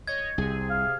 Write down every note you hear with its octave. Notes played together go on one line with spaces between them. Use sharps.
C#5 D#5 G#6
C2 C3 G#4
F5